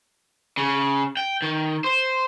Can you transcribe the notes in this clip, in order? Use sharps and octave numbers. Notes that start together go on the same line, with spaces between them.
C#3
G5
D#3
C5